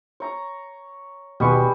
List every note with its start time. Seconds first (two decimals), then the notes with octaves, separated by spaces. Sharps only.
0.20 C#5 A#5
1.40 D#2 B2 G3 G#3 B4 C#6